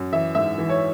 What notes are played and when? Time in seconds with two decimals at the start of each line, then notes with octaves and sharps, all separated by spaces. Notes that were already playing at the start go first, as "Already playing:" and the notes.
Already playing: F#2
0.12 E3 E5
0.35 G#2 E5
0.58 E3
0.69 C#5